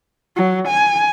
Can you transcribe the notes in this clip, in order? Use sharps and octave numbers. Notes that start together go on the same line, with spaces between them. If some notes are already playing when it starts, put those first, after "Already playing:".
F#3
G#5